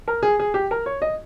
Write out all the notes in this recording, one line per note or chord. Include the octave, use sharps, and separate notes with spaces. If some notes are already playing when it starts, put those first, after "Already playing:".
A#4
G#4
G#4
G4
A#4
C#5
D#5